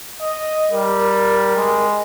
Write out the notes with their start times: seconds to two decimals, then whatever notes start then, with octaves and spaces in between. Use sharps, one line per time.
0.21 D#5
0.71 G3 A#4
1.56 G#3